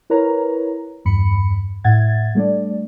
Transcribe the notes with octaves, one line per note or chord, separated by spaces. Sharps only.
E4 A#4 B4 C#5 A#5
E2 G2 B5 C#7
A2 E5 F#5 G#6 A6
G3 A3 D4 D5